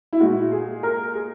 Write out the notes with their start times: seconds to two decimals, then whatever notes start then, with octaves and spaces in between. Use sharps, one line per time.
0.13 E4
0.20 A#2 G#3 F#4
0.52 G#4
0.83 A#4
1.14 G#4